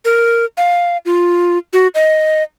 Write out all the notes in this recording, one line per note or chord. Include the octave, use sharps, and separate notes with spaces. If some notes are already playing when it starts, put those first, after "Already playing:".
A#4
F5
F4
F#4
D#5